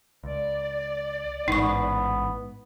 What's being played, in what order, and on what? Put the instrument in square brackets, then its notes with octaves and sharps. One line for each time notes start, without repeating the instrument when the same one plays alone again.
[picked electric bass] C#2 [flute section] D5
[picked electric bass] A1 G#2 [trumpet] B3 [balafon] D#4 C#6